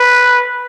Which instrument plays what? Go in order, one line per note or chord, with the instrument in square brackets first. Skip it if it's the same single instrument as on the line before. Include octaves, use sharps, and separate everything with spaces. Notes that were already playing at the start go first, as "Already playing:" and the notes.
Already playing: [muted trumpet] B4